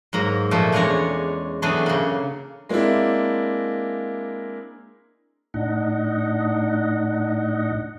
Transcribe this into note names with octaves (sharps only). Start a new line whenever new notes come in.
G#2 F#3 A#3 A#5
A#2 F3 A3 A#3
E2 G#3 C#4 D4 C#5 A#5
E3 F#3 A3 B3 D4 G#4
C#3 A#3
G#3 A#3 C4 D4 E4
A2 D4 D#4 D#5 F#5